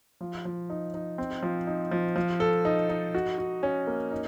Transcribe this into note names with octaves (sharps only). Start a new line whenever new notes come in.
F3
F3
D#4
D#4
C4
F3
D#4
F3
F3
A4
D#4
D#4
F#4
F#4
C#4
A#3
D#4